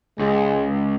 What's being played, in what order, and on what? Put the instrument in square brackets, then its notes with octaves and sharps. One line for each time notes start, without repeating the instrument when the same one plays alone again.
[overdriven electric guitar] C#2 [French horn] G#3